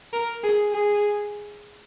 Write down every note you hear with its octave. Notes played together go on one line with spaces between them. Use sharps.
A#4
G#4
G#4